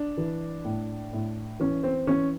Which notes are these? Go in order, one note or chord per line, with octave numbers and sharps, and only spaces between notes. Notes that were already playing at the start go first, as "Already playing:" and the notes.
Already playing: D4
E3
A2
A2
E3 C#4
C4
E3 C#4